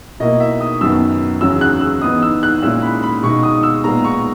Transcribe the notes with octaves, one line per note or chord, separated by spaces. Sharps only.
B2 A#3 E4 D#5
E5
D#6
F#2 D#3 F#3 B3 E6
E2 C#3 F#3 C#4 E4 E6
F#6
E6
G#2 E3 B3 D#4 D#6
E6
F#6
A#2 G#3 C#4 E4 E6
B5
B5
B2 G#3 D#4 C#6
D#6
E6
A#2 G#3 B3 A#5
C#6